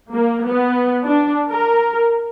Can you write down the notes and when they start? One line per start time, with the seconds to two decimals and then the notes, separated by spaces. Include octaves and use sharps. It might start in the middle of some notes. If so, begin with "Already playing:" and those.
0.12 A#3
0.46 B3
1.06 D4
1.50 A#4